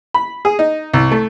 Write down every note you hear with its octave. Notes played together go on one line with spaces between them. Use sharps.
B5
G#4
D#4
C2
A3